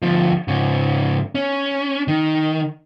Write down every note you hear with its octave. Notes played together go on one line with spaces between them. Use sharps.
D2 F3
G#2 C#3
C#4
D#3